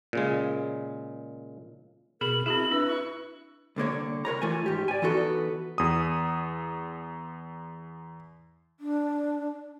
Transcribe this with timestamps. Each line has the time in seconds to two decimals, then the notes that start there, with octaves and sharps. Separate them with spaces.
0.13 A#2 C#3 G#3
2.21 B2 G#4 A#4 B5 F#7
2.46 C4 E4 F#4 G#4 B5 F#7
2.71 D4 B4 E6
2.88 C#6
3.76 C2 D3 A#3 C#5
4.25 A#4 B4 C#5 A#5
4.42 E3 A3 F4 G#5
4.66 G#2 G4
4.88 D5 G#5
5.02 E3 B3 D#4 F#4 A4
5.78 E2 D#6
8.80 D4